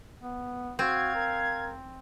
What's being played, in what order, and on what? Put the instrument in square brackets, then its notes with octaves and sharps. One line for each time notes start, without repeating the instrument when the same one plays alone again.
[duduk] B3
[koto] C4 [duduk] F#4 [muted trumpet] F5 [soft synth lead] G#6
[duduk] A#4